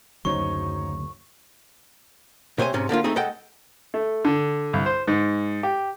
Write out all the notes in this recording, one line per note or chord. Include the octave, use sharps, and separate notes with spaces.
F#1 D2 C#3 F#3 D#4 C5 C#5 C#6
C3 C5 C#5 D#5 G#5
G#2 C3 C#4
D3 A#3 D4 F4
A3 C4 D#4 G#4
G#3 A4 D#5 F#5 G5
A3
D3
C2
C5
G#2
G4